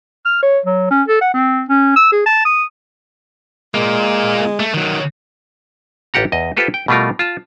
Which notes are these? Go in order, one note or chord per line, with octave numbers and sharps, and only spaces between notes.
F6
C#5
F#3
C#4
A4
F#5
C4
C#4
E6
G#4
A5
D#6
A#2 G#3 A#3
A3
D#3 F#3
A1 F4 G4 F#5 A#5
E2 D#5
F4 G4 A4 B4 C5
G5
B2 G3 A3 F4 A#4
F4 A5